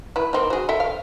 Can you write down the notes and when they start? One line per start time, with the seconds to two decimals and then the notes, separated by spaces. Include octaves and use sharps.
0.16 E4 B4
0.33 A#3 C4 D#4
0.50 F#4 G#4
0.69 A4 E5 G5
0.80 F5